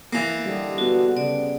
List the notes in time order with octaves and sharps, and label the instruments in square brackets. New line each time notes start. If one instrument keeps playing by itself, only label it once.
[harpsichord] E3 A#3
[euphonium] D3 [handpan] G3 G4 D#5
[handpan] B3 D4 [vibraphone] F#4
[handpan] C#3 [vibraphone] D5